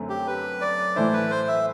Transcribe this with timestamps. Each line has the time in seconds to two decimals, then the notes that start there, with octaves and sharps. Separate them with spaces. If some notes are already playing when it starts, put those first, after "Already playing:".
Already playing: F#2 D3 A3 C4
0.09 G4
0.27 B4
0.61 D5
0.96 A2 E3 A3 E4 C5
1.13 B4
1.31 C5
1.48 E5